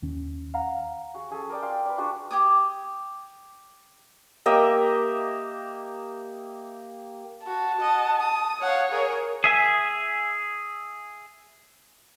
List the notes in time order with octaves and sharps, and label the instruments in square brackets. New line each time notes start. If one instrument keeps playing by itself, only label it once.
[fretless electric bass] D#2 D#3 C#4
[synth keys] F5 F#5 A#5
[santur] F#4 G#4
C#4 G#4 A4
A#4 D5 G5
F5 G5 C6
B4 D5
D4 F4 F#4 G#4
[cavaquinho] G4 G#5 D6 D#6
[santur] A#3 G4 D#5 E5
[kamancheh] F#4 [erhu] A5
[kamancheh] D#5 F#5
D#6
[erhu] C#5 [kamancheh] F5 F#5
[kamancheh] G#4 A#4
[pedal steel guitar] G#4 E5 G#5